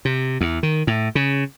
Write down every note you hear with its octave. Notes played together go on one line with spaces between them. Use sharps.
C3
E2
D#3
A2
C#3